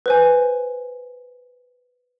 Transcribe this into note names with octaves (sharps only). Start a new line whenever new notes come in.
B4 C5 G#5